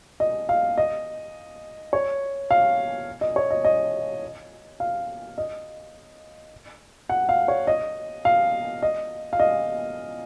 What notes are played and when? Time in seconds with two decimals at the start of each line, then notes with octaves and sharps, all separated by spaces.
0.20 D#5
0.49 F5
0.78 D#5
1.93 C#5
2.51 F5
3.21 D#5
3.36 C#5
3.51 D#5
3.65 D#5
4.80 F5
5.38 D#5
7.09 F#5
7.29 F5
7.48 C#5
7.67 D#5
8.25 F5
8.83 D#5
9.33 F5
9.40 D#5